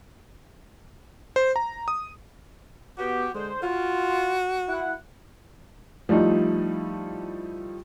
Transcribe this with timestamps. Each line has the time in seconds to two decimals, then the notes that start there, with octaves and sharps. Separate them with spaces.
1.36 C5
1.56 A#5
1.88 D#6
2.98 B3 F#4 G4
3.34 D3 G#3 C5
3.63 F4 F#4
4.68 E4 F#5
6.09 F3 G3 A3 D#4 E4